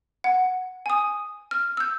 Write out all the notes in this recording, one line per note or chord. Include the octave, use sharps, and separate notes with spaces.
F#5
G#5 D#6
F6
E6 G6